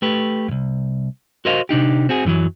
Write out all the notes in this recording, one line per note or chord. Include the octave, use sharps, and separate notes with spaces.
A3 G4 B4
C2 F2
F#4 A#4 C5 D#5 F5
C3 D4 D#4 G4
C4 F#4 G#4
F#2 D3 E3 F#3